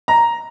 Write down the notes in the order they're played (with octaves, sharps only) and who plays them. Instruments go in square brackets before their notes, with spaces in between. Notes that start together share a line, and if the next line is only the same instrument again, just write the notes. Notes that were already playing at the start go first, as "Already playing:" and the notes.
[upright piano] A#5